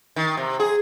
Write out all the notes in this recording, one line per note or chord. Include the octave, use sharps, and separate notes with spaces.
D#3
C3
G#4